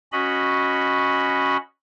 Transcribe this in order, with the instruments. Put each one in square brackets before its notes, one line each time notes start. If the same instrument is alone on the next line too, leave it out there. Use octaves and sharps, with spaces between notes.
[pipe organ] C#4 F#4 D#5 B5